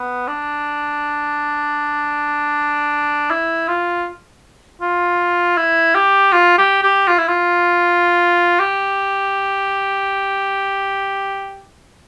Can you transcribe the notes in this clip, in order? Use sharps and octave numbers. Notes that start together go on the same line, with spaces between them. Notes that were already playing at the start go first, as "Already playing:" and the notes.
Already playing: B3
D4
E4
F4
F4
E4
G4
F4
G4
G4
F4
E4
F4
G4